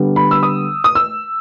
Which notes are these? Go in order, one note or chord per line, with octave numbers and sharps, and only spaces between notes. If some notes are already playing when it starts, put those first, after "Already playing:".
Already playing: D3 G3 B3
B5
E6
D#6
D#6
E6